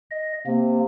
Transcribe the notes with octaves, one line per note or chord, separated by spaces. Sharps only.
D#5
C3 A#3